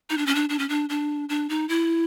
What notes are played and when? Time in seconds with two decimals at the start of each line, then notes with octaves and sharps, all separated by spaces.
0.10 D#4
0.18 D4
0.26 C#4
0.35 D4
0.49 D4
0.59 C#4
0.69 D4
0.89 D4
1.29 D4
1.49 D#4
1.69 E4